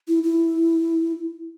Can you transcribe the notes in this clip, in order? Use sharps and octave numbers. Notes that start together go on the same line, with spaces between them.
E4
E4